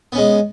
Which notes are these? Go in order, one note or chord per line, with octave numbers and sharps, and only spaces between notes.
G#3 B3 C#4